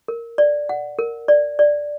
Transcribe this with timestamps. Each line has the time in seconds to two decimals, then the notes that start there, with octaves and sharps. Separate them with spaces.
0.08 A#4
0.38 D5
0.69 F#5
0.99 A#4
1.28 D5
1.59 D5